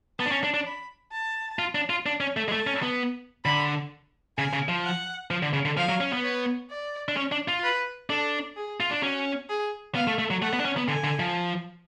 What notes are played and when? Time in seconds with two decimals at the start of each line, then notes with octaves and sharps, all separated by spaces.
0.19 B3 A5
0.26 D4
0.31 C#4
0.44 D4
0.54 D4
0.66 B5
1.12 A5
1.59 F4
1.75 D4
1.90 F4
2.06 D4
2.20 C#4
2.37 A3
2.48 G#3
2.52 A3 A5
2.67 C#4
2.83 B3
3.45 D3 B5
4.37 C#3 G#5
4.53 C#3
4.68 F3
4.84 F#5
5.31 F3
5.42 D3
5.53 C#3
5.65 D3
5.77 F3 F5
5.89 F#3
6.01 C#4
6.13 B3
6.24 C#5
6.70 D5
7.09 D4
7.17 C#4
7.32 D4
7.48 F4
7.63 B4
8.09 D4 A4
8.56 G#4
8.80 F4
8.91 D4
9.03 C#4 F#4
9.49 G#4
9.95 B3 F5
10.07 A3
10.19 A3
10.31 F#3
10.42 A3 F#5
10.53 B3
10.60 D4
10.65 C#4
10.77 B3
10.88 D3 G#5
11.04 D3
11.19 F3